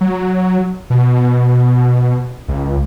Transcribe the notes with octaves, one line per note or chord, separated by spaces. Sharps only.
F#3
B2
C#2